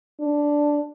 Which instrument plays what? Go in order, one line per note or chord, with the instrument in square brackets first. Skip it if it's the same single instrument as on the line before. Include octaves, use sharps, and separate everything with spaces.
[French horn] D4